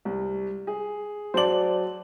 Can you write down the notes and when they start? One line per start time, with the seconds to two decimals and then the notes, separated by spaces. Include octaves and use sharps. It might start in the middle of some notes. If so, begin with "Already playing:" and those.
0.05 C2
0.67 G#4
1.34 F#3 C5 D5 A5 F#7